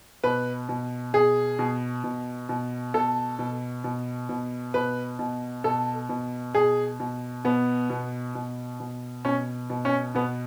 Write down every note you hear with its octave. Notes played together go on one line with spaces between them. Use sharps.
B2 B4
B2
B2 G#4
B2
B2
B2
B2 A4
B2
B2
B2
B2 B4
B2
B2 A4
B2
B2 G#4
B2
B2 B3
B2
B2
B2
B2 C#4
B2
C#4
B2 B3